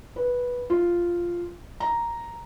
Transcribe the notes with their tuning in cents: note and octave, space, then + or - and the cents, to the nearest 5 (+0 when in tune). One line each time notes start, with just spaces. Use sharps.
B4 -10
F4 -5
A#5 +0